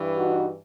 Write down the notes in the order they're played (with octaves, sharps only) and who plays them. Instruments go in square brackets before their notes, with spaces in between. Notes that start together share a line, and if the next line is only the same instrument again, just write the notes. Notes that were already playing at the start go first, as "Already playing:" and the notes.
Already playing: [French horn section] G2 E3
D#4 F#4